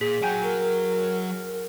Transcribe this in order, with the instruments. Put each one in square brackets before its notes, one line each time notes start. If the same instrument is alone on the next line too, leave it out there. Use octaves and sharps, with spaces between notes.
[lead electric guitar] A#2 [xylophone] G#4 B6
[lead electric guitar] F#3 F#4 [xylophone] G5 G#5 G6
[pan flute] A#4